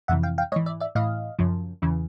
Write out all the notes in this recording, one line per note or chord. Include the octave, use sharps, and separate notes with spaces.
F2 C3 E3 E5 F#5
F5 G5
F5 G5
G#2 E3 C#5 D#5
D5 E5
D5 E5
A2 E3 D#5 F5
F#2 C#3 F3
E2 C#3 E3